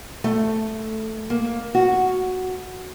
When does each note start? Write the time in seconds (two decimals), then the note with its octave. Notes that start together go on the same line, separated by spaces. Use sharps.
0.24 A3
1.30 A#3
1.75 F#4